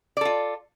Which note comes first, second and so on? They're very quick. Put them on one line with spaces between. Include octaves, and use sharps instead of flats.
D5 A4 F4